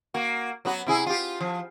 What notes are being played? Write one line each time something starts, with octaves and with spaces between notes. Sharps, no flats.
A#3 F#4
F#3 B3 F#4
C3 E4 G#4
F4 G4
F3